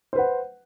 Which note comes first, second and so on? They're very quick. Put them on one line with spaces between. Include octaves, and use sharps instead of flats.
C5 B4 F#5